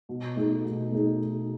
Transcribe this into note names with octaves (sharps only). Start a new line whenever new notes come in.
B2
A3 D#4 G#4
B2
A3 D#4 G#4